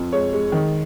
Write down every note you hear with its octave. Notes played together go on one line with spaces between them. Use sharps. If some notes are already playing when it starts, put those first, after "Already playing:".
Already playing: F2
G#3 C#5
G#3
D#3